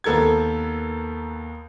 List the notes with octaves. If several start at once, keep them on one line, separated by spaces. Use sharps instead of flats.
D#2 B3 A4 A#4 G#6